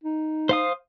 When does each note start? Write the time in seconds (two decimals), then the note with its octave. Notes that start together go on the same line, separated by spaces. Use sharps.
0.04 D#4
0.49 C5 F5 D#6